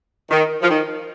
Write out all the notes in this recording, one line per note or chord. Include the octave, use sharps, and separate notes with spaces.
D#3
F3
D#3